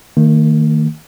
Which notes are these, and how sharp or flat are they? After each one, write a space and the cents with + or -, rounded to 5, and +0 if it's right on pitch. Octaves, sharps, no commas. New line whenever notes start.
D#3 +0 A#3 -45